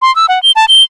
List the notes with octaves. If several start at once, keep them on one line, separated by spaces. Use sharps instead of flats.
C6
E6
F#5
G7
A5
G7